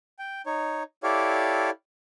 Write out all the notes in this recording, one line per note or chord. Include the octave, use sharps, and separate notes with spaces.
G5
D#4 C#5
E4 G4 A4 C#5 D5 F5